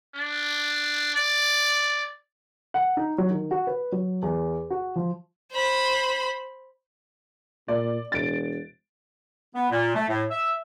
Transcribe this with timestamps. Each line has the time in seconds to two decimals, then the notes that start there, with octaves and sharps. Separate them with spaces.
0.15 D4
1.15 D5
2.74 F#5
2.97 D#4
3.18 F#3
3.30 D#3
3.51 F#4
3.67 B4
3.92 F#3
4.22 E2
4.70 F#4
4.96 F3
5.53 C5 B5
7.68 A#2 D5
8.12 E1 A6 D7
9.55 B3
9.71 A#2
9.95 A3
10.09 A2
10.31 E5